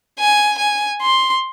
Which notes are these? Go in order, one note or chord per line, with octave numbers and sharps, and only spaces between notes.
G#5
G#5
C6